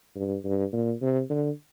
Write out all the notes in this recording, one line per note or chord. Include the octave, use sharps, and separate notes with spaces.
G2
G2
A#2
C3
D3